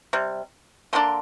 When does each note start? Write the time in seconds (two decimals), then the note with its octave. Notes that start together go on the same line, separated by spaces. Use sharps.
0.13 C3 G3
0.93 D3 F3 A#3 D4 C6